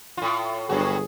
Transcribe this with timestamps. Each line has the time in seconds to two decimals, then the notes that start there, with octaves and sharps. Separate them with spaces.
0.17 A2 F4
0.69 G1 G2 F#3 F#4 G#4